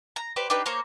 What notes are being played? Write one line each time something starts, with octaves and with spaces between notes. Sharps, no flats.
A#5
G4 B4 C5 D5
D4 D#4 G4 B4
A#3 C5 C#5 A#5